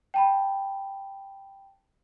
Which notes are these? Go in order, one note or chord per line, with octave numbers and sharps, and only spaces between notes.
G5 A5 B5